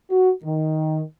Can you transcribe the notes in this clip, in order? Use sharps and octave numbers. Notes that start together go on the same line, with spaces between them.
F#4
D#3